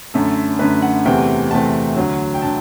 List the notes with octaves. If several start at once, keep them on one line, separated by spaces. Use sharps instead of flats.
F#2 D3 A3 A4
F#2 D3 A3 B4
F#5
E2 C3 E3 A3 C4 G5
E2 C3 E3 A3 C4 A5
D2 D3 F#3
G5
D3 A5